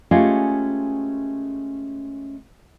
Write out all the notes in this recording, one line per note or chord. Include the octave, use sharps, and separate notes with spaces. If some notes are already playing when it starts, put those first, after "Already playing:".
G#3 A3 C#4 F4 G4 A#4